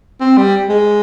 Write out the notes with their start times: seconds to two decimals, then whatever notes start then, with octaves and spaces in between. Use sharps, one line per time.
0.21 C4
0.37 G3
0.69 G#3